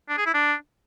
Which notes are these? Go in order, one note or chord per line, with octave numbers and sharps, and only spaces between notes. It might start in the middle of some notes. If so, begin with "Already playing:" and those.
D4
G#4
E4
D4